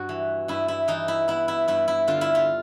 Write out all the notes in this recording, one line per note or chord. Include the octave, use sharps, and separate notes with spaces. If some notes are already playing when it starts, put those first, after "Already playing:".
Already playing: G2 F#4
E3
G2 E4
E4
E3 D#4
E4
B3 E4
E4
G2 E4
E4
D3 F4
E4
F4